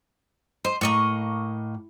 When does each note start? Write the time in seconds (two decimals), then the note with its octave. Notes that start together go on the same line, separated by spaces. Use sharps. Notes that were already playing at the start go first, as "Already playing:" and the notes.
0.65 C5 D#5
0.81 A2 A#3 D#5 C#6